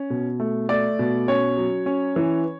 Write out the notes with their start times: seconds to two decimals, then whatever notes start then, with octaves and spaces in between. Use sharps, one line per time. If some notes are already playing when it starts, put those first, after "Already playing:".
Already playing: C#4
0.10 B2
0.40 A3
0.69 A3 D5
0.99 B2
1.28 C#4 C#5
1.57 F#3
1.86 C#4
2.16 E3